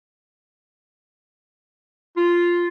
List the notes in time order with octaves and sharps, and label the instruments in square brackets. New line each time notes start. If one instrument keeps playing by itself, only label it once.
[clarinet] F4